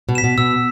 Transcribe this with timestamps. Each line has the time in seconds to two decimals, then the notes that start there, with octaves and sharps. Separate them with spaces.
0.09 B2
0.15 B6 E7
0.24 B2
0.38 B2 E6